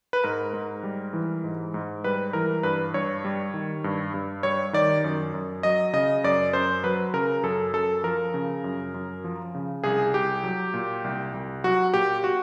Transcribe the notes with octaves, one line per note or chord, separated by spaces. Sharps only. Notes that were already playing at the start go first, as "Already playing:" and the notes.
B4
G#2 A#4
G#2
G3
E3
G#2
G#2
G3 B4
E3 A#4
G2 B4
G2 C#5
G3
D#3
G2
G2
G3 C#5
D#3 D5
F#2
F#2
F#3 D#5
C#3 D#5
F#2 D5
F#2 C5
F#3 B4
C#3 A#4
F#2 A4
F#2 A4
F3 A#4
C#3
F#2
F#2
F3
C#3
C2 G#4
C2 G4
F#3
A#2
C2
C2
F#3 F#4
A#2 G4
F#4